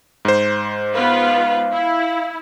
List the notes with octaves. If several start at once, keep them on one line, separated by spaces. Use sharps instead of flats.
G#2 C5
B3 F4 B4 F5
E4